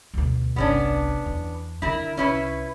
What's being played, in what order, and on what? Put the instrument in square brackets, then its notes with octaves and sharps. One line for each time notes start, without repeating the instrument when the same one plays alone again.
[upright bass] D2 B2
[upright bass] G1 C2 [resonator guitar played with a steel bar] B3 C#4 D4
[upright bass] E2
[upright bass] D3 [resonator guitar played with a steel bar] E4 A#4
[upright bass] C2 [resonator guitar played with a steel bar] C#4 E4 B4